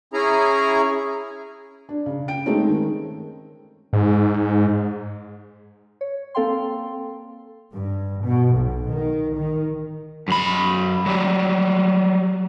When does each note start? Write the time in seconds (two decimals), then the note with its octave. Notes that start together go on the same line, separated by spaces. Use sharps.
0.13 C#4 E4 G#4 A#5
1.89 D4
2.06 C#3
2.28 G5 D7
2.46 G#3 A3 C4 C#4 D#4
2.69 D#3
3.93 G#2
6.01 C#5
6.35 A#3 C4 A4 F5 G5 C6
7.73 G2
8.24 B2
8.56 B1
8.90 D#3
9.36 D#3
10.28 F#2 B5
11.06 F#3 G3